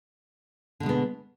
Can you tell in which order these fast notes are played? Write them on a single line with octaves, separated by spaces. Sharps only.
D3 B2 G#3 B3